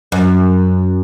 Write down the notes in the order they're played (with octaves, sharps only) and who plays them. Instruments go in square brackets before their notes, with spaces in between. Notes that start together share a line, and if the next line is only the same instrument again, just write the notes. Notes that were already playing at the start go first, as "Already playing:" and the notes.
[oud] F#2